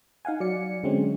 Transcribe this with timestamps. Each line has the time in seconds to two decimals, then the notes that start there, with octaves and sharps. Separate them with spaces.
0.25 D#4 F5 F#5 G#5
0.40 F#3 D5 C#7
0.83 D3 F#3 G#3 C4 C#4